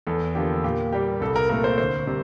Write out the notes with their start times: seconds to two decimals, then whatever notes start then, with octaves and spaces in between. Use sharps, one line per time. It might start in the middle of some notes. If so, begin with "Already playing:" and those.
0.07 E2 A4
0.35 D3 F3 A#3 G4
0.64 A#2 G4
0.93 G3 A#3 G4
1.21 C2 A4
1.36 A#4
1.49 A#2 A3 A#4
1.64 C5
1.78 D2 C5
2.07 C3 G3 A#3